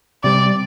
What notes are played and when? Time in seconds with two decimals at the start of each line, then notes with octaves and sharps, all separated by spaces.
0.23 C3 G3 C4 D5